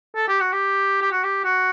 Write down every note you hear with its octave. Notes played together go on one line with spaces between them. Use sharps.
A4
G4
F#4
G4
G4
F#4
G4
F#4